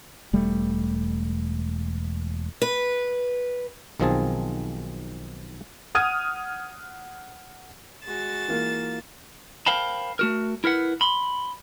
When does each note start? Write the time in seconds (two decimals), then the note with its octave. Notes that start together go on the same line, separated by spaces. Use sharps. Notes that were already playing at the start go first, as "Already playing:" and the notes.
0.33 E1 G3 A3
2.62 B4
4.00 B1 D#3 F3 C4 G#4 A5
5.95 F#5 D#6 F6 G#6 D#7
8.05 G#3 F#4 A6 E7
8.48 E3 A#3 F4
9.66 A#4 C5 F5 G5 A5 B5
10.19 A3 F#4 A#4
10.64 E4 A#4 B4 F#5
11.01 B5 C6